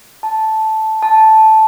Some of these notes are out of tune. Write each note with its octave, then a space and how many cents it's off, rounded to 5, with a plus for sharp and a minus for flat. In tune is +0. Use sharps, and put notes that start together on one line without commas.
A5 -5
A5 -5